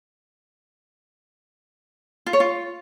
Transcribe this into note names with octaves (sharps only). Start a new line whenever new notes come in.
F4
C#5
F4